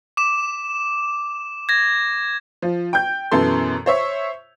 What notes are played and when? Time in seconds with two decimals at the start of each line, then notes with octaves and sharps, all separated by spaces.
0.17 D6 E7
1.69 G#6 A#6
2.62 F3
2.93 G5 G6
3.31 F#2 B2 E3 A4 C6
3.86 C5 C#5 E5